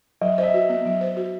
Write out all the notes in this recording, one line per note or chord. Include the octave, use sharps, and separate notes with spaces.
F#3 D#5
C5 D#5
E5
F#4
B3
F#3
C5
F#4